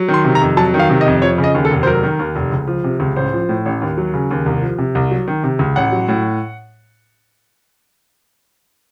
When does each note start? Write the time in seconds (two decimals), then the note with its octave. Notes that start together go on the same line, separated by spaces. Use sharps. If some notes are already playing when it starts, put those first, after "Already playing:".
Already playing: F#3
0.08 D#3
0.14 C6
0.25 C3
0.35 A#5
0.42 F2
0.57 F#3 A5
0.74 D#3
0.79 F5
0.90 C3
1.01 D#5
1.06 F2
1.22 F3 C#5
1.38 C#3
1.44 D#5
1.54 D#2
1.65 A4
1.71 F1
1.83 C5
1.87 F#3 A#4
2.03 D#3
2.19 D#2
2.36 F1
2.52 C#2
2.67 F3
2.84 C3
3.00 C#2
3.16 A1 C5
3.33 F3
3.49 A2
3.65 A1
3.81 D#2
3.97 F#3
4.14 C#3
4.31 D#2
4.46 C2
4.62 F3
4.78 C3
4.95 C2
5.11 F#3
5.28 D#3
5.43 C3
5.59 C#2
5.76 A1 F#5
5.92 F#3
6.08 A2